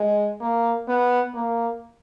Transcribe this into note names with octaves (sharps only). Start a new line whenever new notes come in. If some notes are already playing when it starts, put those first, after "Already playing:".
Already playing: G#3
A#3
B3
A#3